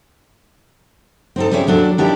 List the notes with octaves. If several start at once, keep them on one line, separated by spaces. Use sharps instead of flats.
C4 D#4 A4
G3 C4 C#4 E4 G#4
D#2 F#3 D4 A4
D#3 D4 E4 G4 D5